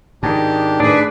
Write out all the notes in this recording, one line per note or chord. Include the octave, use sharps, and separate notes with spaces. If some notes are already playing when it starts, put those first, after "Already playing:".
G#2 D#3 D4 G4
A2 D4 G#4 B4